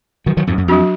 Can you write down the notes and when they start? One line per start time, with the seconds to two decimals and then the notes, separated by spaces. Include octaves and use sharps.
0.26 D#3 F#3
0.37 D#3 F#3
0.47 F2 G#2
0.58 F#2
0.68 F2 F#3 D4 F#4